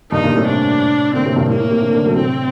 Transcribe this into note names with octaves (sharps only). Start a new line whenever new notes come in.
G2 A#2 D#4
G2 A#2
A2 C3
D4
A#2 D3 C4
A2 C3
G2 A#2
A2 A#3
A2
A2 C3
A#2 D3
A#2 D3
F#3 A3
A2 C3 C4